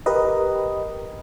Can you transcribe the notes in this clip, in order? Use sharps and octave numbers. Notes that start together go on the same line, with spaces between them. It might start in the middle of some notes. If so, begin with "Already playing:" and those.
G4 A#4 B4 D#5